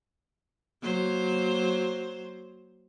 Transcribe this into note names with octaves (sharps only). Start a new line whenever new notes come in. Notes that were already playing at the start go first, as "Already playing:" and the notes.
F#3 A#3 C5